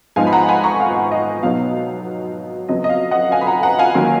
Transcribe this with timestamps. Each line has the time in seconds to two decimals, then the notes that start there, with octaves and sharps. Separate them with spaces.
0.16 G#2 F3 B3 D#4 F5 G#5
0.27 B5
0.32 F#5 A#5
0.48 G#5 B5
0.63 A#5 C#6
0.80 F5
1.11 D#5
1.43 B2 F#3 B3 D#4 F5
2.68 F2 C#3 F#3 B3 D#5
2.84 D#5
2.89 F5
3.11 D#5 F#5
3.31 F5 G#5
3.41 B5
3.47 F#5 A#5
3.63 F#5 A#5
3.79 F5 G#5
3.94 D#3 F#3 A#3 C#4